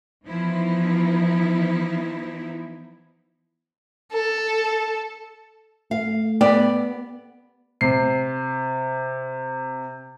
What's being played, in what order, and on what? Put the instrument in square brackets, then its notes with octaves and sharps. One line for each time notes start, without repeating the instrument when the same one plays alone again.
[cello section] E3 F3 B3 D#4 E4
[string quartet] A4
[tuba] A3 [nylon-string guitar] F5
[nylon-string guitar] B3 [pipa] G4 D5
[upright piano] C3 C7